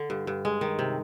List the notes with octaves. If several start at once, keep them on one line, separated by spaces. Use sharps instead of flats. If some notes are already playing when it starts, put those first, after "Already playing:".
Already playing: D3
G2
G2
G#3
D#3
C3